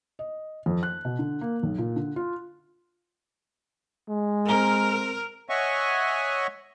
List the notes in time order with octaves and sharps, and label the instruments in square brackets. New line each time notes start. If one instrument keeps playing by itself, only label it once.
[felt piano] D#5
F2
F#6
B2
D3
A#3
B1
A#2
D3
F4
[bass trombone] G#3
[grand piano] C4 A#5 G7 [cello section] A#4
[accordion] C#5 D#5 E5 F#5 G#5 C#6